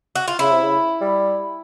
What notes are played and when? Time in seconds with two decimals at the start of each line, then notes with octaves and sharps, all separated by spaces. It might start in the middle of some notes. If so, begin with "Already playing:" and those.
0.16 F#4
0.28 F4
0.39 C#3 E4
0.51 C3
0.63 C#3
1.01 G3